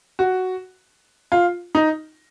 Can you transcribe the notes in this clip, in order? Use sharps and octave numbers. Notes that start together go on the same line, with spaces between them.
F#4
F4
D#4